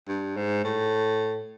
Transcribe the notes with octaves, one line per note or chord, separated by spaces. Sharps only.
G2
G#2
A2